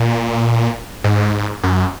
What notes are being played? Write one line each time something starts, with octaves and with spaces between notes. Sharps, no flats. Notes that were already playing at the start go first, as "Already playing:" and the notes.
Already playing: A#2
G#2
F#2